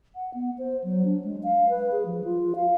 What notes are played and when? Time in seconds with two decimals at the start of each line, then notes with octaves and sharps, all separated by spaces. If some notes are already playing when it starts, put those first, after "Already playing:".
0.15 F#5
0.34 B3
0.58 C5
0.84 F#3
1.05 D4
1.24 G#3
1.44 F5
1.69 B4
1.92 G#4
2.06 F3
2.25 F4
2.56 F5